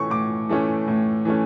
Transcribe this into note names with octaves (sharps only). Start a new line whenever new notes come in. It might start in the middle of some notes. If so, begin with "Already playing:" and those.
Already playing: A2 E3 A3 C#4 C#6
A2 D6
E3 A3 C#4
A2
E3 A3 C#4